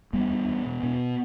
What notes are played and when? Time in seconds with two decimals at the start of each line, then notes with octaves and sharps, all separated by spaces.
0.13 E2 G3 B3
0.31 E2
0.48 E2
0.65 B2
0.83 B2